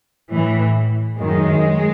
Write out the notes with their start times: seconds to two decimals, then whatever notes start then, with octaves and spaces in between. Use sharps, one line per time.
0.31 A2 E3
1.18 F#2 D#3 G#3